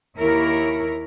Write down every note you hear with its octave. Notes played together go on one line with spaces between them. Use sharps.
D#2 E4 A#4 C#5